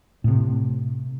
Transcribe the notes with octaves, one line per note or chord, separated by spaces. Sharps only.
A2 C3